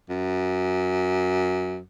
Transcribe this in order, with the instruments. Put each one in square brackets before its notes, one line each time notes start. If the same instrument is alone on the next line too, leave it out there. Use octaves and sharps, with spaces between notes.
[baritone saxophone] F#2